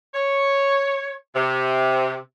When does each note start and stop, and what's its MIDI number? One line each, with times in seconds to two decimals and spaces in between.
0.14 1.10 73
1.35 2.14 48